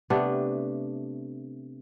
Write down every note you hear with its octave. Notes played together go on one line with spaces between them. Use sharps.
C3 A3 B3 D4